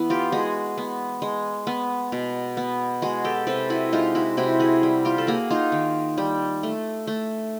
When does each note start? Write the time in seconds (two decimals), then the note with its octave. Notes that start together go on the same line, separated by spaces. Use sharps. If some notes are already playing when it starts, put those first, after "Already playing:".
Already playing: E3 B3
0.10 F4 G4
0.32 G#3 F#4 G#4
0.78 B3
1.22 G#3
1.67 B3
2.12 B2
2.57 B3
3.02 G#3 F#4 G#4
3.24 G4 A4
3.47 C3 A4 B4
3.70 E4 F#4
3.92 G#3 D#4 F4
4.15 E4 F#4
4.37 C3 E4 F#4
4.59 F#4 G#4
4.83 G3
5.05 F4 G4
5.18 A4
5.27 A#3 F#4 G#4
5.50 D#4 F4
5.72 D#3
6.18 G3
6.63 A3
7.07 A3